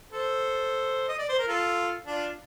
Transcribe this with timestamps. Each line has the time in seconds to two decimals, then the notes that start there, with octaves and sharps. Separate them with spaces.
0.12 A4 C5
1.08 D#5
1.19 D5
1.29 C5
1.39 A#4
1.48 F4 A4
2.07 D4 F4